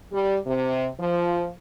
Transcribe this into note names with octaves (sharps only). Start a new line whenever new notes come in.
G3
C3
F3